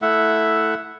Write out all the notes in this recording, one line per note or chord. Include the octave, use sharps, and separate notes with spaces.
A3 E4 E5 F#5